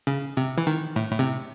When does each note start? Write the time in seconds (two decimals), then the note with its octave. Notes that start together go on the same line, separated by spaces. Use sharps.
0.07 C#3
0.37 C3
0.58 E3
0.67 D#3
0.96 A2
1.12 A2
1.19 C3